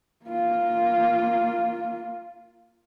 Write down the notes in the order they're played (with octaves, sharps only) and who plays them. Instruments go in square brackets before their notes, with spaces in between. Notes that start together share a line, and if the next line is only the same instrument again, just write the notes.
[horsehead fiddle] A#3 F4